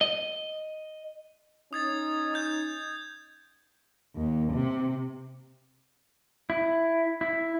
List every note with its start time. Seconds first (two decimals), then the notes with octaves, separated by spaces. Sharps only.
0.01 D#5
1.73 C#4 D#4 D#6 G#6 A6
2.34 D#6 G6 G#6
4.16 D#2
4.53 C3
6.50 E4
7.21 E4